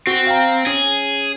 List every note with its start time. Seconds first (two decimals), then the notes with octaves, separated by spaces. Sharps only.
0.07 C4 F#4
0.27 F5 G5 A#5
0.67 C#4 G#4